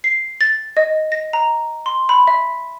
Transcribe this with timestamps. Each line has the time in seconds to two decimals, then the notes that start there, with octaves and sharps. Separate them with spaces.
0.04 C7
0.41 A6
0.77 D#5
1.12 A#6
1.33 A#5
1.86 C6
2.09 B5
2.27 E5